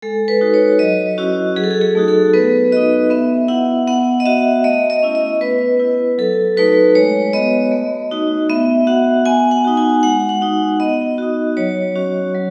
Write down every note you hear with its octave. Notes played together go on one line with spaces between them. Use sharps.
G#3 A4
B4
D#4 F#4
C#5
F#3 D#5
C#4 E4 F#4
F#3 G#4
A4
G#4
G#4
A3 D#4 F#4
A4
B3 B4
D#4 F#4 D#5
B3 E5
E4 F#5
B3 F#5
D#5
F#4 E5
A3 D#5
D#5
C#4 E4
D#5
B3 B4
E4
F#3 A4
A3 D#4 F#4 B4
G#3 C#5
B3 F#4 D#5
A3
D#4 F#4
B3 E5
F#4 F#5
B3 G#5
F#5
D#4 F#4
G#5
G#3 F#5
F#5
D#4 F#4
B3 D#5
D#4 F#4
F#3 C#5
C#4 F#4
F#3